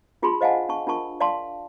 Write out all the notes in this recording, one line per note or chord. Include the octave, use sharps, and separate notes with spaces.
D4 F4 G#4 A5 B5 C6
C5 D#5 F5 F#5 G#5 A5
D4 A5 C#6
D4 F4 A#4 A5 C#6
D5 F5 A5 C6